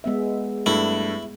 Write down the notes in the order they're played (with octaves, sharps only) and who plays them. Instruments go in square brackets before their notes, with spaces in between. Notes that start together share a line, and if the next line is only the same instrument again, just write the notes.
[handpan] G#3 B3 E5
[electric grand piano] G2 A3 [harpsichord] E4